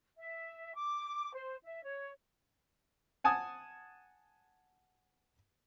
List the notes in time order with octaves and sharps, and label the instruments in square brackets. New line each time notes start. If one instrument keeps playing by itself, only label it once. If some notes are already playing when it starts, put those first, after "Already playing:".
[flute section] E5
D6
C5
E5
C#5
[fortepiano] F#5 G#5 A5 D#6